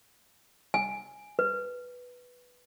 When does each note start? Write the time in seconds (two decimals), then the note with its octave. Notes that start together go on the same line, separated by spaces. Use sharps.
0.74 G#5
1.39 B4